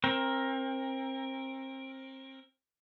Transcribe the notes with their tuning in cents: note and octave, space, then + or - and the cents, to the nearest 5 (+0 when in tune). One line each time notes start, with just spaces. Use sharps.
C4 +30 A#4 +10